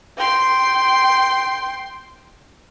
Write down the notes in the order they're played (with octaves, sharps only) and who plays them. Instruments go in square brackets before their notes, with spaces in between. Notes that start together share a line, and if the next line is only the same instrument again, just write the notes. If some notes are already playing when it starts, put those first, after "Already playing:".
[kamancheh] G5 C6